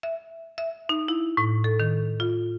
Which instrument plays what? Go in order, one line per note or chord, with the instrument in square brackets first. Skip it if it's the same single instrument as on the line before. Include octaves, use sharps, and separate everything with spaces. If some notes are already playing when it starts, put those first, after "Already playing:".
[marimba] E5
E5
D#4
E4
A2
A4
D#3
F4